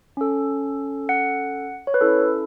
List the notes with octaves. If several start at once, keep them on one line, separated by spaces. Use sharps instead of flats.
C#4 A4
F#5
C#5
B4
C#4 E4 A4